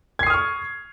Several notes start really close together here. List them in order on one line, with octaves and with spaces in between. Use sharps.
G#6 C7 D#6 F6 C#6